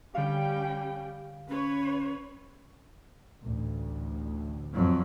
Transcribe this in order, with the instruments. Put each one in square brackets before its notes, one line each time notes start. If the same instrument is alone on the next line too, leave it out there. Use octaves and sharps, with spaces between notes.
[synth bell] D3 F5 [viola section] G3 C#4 G5
[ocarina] C#4 [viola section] B4 C#5
[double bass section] A1 D2 A2
[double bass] F2 F#3